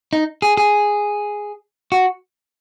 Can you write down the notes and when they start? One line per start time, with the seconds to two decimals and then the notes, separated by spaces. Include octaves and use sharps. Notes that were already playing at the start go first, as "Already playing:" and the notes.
0.13 D#4
0.42 G#4
0.57 G#4
1.92 F#4